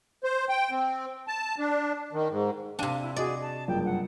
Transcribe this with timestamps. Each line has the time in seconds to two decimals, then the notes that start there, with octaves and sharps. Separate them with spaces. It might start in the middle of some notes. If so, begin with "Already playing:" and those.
0.24 C5
0.49 G5
0.71 C4
1.28 A5
1.58 D4
2.13 D#3
2.30 G#2
2.79 C3 D4 F5 G5 A5 D#7
3.02 E4
3.16 F#4 G#4 D5 D#5
3.41 A5
3.68 F#1 G2 F3 G5
3.85 F#5